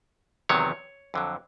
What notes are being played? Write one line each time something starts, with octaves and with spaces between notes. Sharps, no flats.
E2 C3 D#3 F#3 C#5
F2 D3 F#3